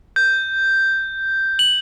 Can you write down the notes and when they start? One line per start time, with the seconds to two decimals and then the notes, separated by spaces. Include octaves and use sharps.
0.16 G6
1.59 F#7